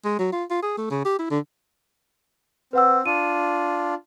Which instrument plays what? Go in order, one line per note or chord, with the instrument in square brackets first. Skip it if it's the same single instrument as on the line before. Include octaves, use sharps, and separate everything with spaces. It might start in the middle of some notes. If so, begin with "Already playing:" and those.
[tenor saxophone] G#3
F#3
F4
F4
G#4
A3
C#3
G4
E4
D3
[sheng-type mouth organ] C4 [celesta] B4 F#5 E6
[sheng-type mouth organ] D4 F4 [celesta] D#7